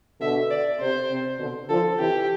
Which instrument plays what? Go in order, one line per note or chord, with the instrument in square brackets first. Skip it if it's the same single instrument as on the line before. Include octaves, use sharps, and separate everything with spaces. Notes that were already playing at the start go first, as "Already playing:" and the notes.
[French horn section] B2 D3 [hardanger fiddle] E5
[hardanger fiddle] D5
[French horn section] C3 [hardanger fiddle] C5
[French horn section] C3
B2 D3
[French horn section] D3 F3 [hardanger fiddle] A4
[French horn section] C3 E3 [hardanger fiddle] G4